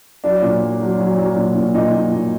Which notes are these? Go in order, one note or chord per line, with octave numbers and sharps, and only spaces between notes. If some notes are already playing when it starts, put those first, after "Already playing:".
F#3 D4
A#2
F#3
F#3
F#3
F#3
A#2
A#2
A#2 D#4
A#2
A#2